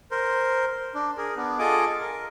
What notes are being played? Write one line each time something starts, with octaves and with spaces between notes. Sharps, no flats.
A#4 C5
D4
G#4 A#4
B3 D4
F4 G#4 A4 D#5 G#5 D6
A#4